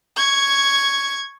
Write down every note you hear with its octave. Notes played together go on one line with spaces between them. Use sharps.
C#6 G#6